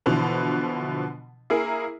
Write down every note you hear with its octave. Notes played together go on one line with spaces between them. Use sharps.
B2 D3 E3 F3
A#3 E4 G#4 A#4